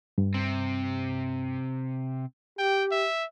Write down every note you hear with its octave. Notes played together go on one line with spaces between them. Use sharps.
G2
C3 C4
G4 G5
E5